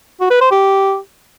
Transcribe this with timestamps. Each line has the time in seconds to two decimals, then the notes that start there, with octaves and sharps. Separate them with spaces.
0.20 F#4
0.31 B4
0.41 C5
0.51 G4